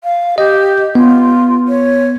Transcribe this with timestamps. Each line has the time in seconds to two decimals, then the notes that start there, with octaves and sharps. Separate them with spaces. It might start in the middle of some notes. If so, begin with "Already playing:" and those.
0.04 F5
0.38 G4 D#5
0.95 B3 F4
1.68 C#5